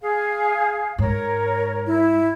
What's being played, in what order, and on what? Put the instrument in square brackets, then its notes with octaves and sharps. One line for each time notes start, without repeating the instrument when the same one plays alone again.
[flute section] G#4 F5
[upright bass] G#2 [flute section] A#4 C#5
[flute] E4